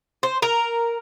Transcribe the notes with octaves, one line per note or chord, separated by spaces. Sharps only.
C5
A#4